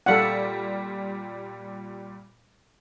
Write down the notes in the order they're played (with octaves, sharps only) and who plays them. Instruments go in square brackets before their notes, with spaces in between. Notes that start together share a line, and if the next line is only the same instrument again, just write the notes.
[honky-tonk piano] A#2 G3 [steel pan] A4 F5 F#5